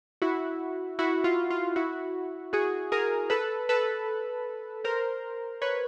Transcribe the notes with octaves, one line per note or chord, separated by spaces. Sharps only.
E4 F#4
E4 F#4
F4
F4
E4 F#4
F#4 G#4
G#4 A#4
A4 B4
A4 B4
A#4 C5
B4 C#5